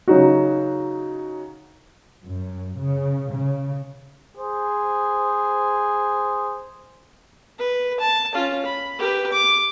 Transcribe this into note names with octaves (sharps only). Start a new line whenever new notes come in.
C#3 F#3 D#4 F#4
F#2
C#3
C#3
G#4 C5
B4
A5
C#4 F4
B5
G4 B4
D6